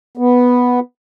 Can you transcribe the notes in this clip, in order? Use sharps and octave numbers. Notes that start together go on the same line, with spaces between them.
B3